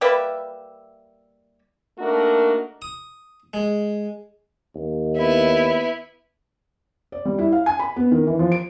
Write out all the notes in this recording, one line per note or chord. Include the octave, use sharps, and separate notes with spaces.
G3 A#3 B4 E5
A3 A#3 D4 D#4 F#4 A#4
D#6
G#3
D#2
B3 E4
D5
G3
E4
F5
G#5
B5
B3
D#3
E3
F3
D7